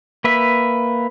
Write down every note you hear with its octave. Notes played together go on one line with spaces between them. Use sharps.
A#3 B4 E5